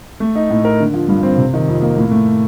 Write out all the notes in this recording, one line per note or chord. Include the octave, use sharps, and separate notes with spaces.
A3
D#4
A2
A#4
D3
F3
G2
C4
C3
D#3
F2
A#3
A2
A3